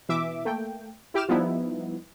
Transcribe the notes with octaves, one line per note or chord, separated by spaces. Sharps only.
B2 E3 E5 D6
A3 A#3 G5
E4 G4 G5 D6 F6 E7
F3 G3 B3 D#4 E4